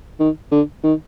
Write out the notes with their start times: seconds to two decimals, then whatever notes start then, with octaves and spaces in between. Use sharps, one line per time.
0.20 D#3
0.51 D3
0.83 D#3